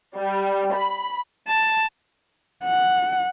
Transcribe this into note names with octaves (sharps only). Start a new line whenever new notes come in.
G3
B5
A5
F#5